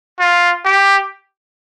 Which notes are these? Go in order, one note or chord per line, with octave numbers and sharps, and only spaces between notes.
F4
G4